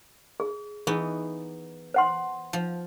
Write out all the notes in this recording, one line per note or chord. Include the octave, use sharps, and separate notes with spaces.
G#4
E3 B3 D#4 G#4
C5 F#5 C6
F3